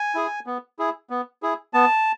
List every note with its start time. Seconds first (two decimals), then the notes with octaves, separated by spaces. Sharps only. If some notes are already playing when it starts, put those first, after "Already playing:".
Already playing: G#5
0.15 E4 G#4
0.46 B3
0.79 E4 G#4
1.10 B3
1.43 E4 G#4
1.73 B3 A5